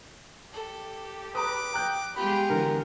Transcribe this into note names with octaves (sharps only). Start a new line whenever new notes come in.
G4 A4
B4 A#5 D6 D#6
G5 A#5 F#6 G6
G#3 B3 F4 G4 B5
D3 E3 A#4